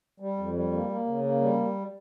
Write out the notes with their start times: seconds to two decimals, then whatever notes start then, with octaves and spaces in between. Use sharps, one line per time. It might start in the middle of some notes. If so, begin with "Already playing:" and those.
0.20 G3
0.37 F2
0.54 G3
0.72 A#3
0.89 A#3
1.06 C#3
1.24 A#3
1.41 G3